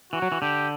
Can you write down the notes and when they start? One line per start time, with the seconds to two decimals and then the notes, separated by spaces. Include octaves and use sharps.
0.13 E3 F#4
0.22 F#3
0.32 E3
0.42 D3 G4